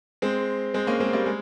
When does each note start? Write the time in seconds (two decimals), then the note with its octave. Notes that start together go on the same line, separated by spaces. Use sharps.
0.22 G#3 C4
0.74 G#3 C4
0.87 A#3 C#4
1.00 G#3 C4
1.13 G3 A#3
1.26 G#3